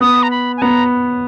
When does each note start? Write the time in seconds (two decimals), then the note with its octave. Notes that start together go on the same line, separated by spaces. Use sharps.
0.01 B3 D#6
0.23 A#5
0.31 B5
0.57 G#5
0.62 B3 A#5